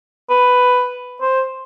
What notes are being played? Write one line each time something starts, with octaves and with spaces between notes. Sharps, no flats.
B4
C5